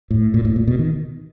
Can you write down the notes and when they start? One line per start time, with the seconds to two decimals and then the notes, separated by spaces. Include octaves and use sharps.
0.11 A2
0.34 A#2
0.45 A2
0.56 A#2
0.68 B2
0.79 D#3